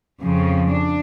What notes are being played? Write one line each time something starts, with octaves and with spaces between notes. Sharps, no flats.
F2 C#3 F3
D4